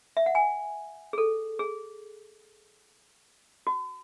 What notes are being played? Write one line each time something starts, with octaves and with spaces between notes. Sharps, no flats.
E5
F#5
G#5
G#4
A4
G#4
F#4